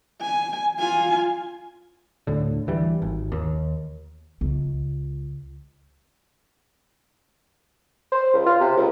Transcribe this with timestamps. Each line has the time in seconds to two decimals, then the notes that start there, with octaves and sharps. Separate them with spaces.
0.22 G#5
0.80 F4 G#5
2.27 D2 A2 D3
2.67 D2 E3 G3
3.02 G#1
3.32 D#2
4.41 C#2
8.12 C5
8.33 C#2
8.46 F4
8.60 C3
8.77 C#2